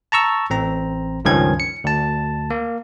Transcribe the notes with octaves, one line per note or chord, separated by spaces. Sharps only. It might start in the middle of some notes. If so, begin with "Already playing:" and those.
A5 A#5 C#6 E6
A1 C4 A#5
C#2 G2 D#3 F3 C#4 G#6
C#7
D2 A5
A#3